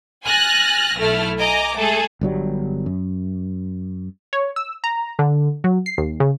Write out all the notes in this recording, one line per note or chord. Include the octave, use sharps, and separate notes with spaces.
G#5 F6 F#6 A6 A#6
B1 A3 E4 F6
D#5 G#5 A#5 D6
G#3 A3 G#4 A4
G1 G2 F#3 G3
F#2
C#5
E6
A#5
D3
F#3
C7
D#2
C#3